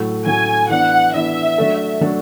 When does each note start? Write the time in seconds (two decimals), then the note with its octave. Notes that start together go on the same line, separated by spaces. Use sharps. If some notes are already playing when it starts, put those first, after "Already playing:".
Already playing: A2 F#3 A3
0.26 A2 F#3 A3 G#5
0.70 E3 B3 D4 F#5
1.14 E3 B3 D4 E5
1.58 F#3 A3 D4 A4
2.01 F#3 A3 D4 A4